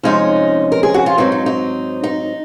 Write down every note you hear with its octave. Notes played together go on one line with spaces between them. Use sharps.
C3 F3 G#3 C#4 D#4
A#4
G#4
F#4
F4
G#2 F#3 C4 D#4
D#4
D#4
D#4